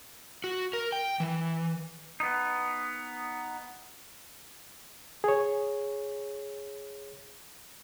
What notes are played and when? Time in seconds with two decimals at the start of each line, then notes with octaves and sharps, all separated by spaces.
0.44 F#4
0.73 A#4
0.92 G5
1.20 E3
2.20 B3 D#4
5.24 G#4 C#5